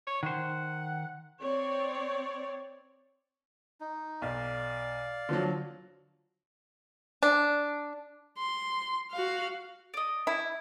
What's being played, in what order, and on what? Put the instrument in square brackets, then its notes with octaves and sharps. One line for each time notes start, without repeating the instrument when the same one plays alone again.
[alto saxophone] C#5
[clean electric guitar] D#3 C5 [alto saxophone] F#5
[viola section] C4 C#5 D5
[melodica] D#4
[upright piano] B1 [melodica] D5 F5
[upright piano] D3 F3 F#3
[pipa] D4
[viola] C6
F#4 F5
[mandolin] D5 D#5
[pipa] E4